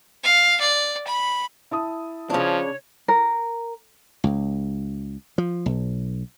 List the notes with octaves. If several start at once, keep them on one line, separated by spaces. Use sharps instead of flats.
F5
D5
B5
E4 A5 D#6
C#3 F3 D4 C#5
A#4
C#2
F3
B1